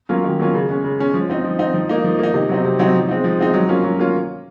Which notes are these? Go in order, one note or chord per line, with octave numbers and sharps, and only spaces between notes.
F#3 A#3 C#4 F4
D#3
F#3 A#3 C#4 F4
C#3
G#3 C#4
C#3
G#3 C#4
F3
C4 D#4
F3
C4 D#4
F3
A#3 D#4
F3
A#3 D#4
C3
F#3 C4 D#4
C3
F#3 C4 D#4
F3
G#3 C4 D#4
F3
G#3 C4 D#4
F#3
A#3 C#4 F4
F#3
A#3 C#4 F4